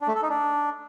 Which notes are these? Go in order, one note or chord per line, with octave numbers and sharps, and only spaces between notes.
D4
A3
A4
D#4
D4